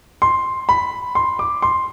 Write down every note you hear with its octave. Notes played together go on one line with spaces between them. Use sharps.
C6
B5
C6
D6
C6